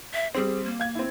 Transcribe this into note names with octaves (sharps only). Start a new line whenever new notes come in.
E5
G3 C4 G#4
A#3
F5 G#6
C4 E4